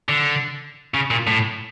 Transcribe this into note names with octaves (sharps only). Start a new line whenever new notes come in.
D3
C#3
A#2
A2